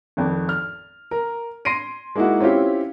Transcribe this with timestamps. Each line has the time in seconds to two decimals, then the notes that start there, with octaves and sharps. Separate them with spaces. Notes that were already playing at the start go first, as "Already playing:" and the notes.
0.17 G#1 F2
0.49 F6
1.11 A#4
1.65 C6 A#6 C7 D7 D#7
2.15 G#3 A#3 D#4 E4 F#4
2.41 C4 C#4 E4 F4 G4